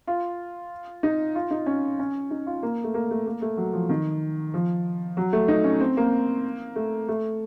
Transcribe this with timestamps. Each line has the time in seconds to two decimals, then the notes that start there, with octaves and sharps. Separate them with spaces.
0.07 F4
1.03 D#4
1.35 F4
1.51 D#4
1.66 C#4
1.99 C#4
2.30 D#4
2.46 F4
2.63 A#3
2.84 A3
2.94 A#3
3.11 A3
3.26 A#3
3.42 A3
3.57 F#3
3.73 F3
3.89 D#3
4.54 F3
5.17 F#3
5.33 A3
5.48 D#4
5.64 C#4
5.80 C4
5.97 A#3
6.76 A3
7.08 A3